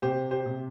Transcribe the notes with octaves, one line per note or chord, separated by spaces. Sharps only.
C3 G4 C5
G4 C5
C3